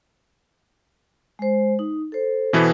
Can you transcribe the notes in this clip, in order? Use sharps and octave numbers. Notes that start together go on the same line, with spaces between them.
G#3 C5
D#4
A4 C5
B2 E3 B3